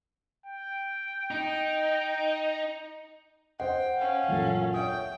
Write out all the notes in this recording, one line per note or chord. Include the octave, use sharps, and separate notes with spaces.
G5
D#4
C5 D#5 F#5 G5
C#4 F5
A1 F#2 A#2 A4
C#5 E5 G5 D#6